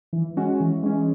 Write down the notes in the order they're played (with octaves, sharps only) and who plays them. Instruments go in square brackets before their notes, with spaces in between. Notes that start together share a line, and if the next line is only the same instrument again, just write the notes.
[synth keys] E3
G#3 C#4 F#4
E3
G#3 C#4